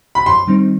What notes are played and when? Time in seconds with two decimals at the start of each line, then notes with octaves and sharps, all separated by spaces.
0.15 B5
0.26 F#2 C6
0.47 D#3 G3 C4 D#4